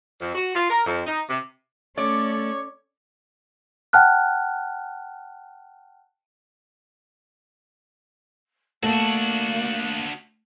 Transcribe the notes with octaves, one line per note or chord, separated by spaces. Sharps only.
F2
F#4
F4
A#4
F2
D#4
C3
A3 C#4 A4 C#5 D5
F#5 G5 A5 F6 F#6
A3 A#3 D4 F#4